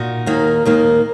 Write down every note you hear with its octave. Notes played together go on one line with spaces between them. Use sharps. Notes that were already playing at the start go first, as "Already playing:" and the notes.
Already playing: A#2 D#4 F#4
D#2 D#3 A#3
D#2 D#3 A#3